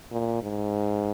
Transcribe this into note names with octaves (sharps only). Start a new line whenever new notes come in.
A#2
G#2